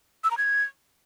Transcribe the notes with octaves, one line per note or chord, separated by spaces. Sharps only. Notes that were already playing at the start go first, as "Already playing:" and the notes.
E6
A#5
G#6